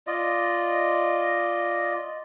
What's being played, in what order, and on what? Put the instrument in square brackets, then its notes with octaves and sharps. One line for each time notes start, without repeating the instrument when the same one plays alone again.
[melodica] F4 D5 D#5